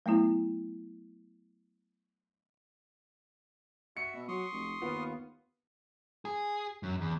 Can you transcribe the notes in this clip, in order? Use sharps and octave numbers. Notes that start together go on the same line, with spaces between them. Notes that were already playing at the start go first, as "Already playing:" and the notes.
F#3 A3 B3 E4
F#4 E5 C#7
B2
F#3 C6 C#6 D#6
F1
D#2 B3 F4
G#4
F#2
E2